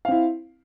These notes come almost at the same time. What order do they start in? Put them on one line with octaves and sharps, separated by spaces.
F5 C4 E4